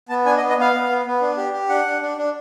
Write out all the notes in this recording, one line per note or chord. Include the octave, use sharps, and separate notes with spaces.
B3 A5
D4 G#5
D#5
B3
D#5
B3 F5
B3
B3
B3
D4
G4
G4
D4 F#5
D4
D4
D4